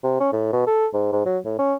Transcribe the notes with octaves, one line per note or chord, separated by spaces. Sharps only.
C3
C#4
A2
B2
A4
G#2
G#2
F#3
A2
C#4